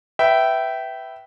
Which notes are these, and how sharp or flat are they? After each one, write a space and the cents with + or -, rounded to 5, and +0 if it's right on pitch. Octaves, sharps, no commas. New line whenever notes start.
B4 +0 E5 +0 G5 -20